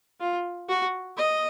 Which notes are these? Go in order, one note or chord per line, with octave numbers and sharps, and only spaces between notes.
F4
F#4
D#5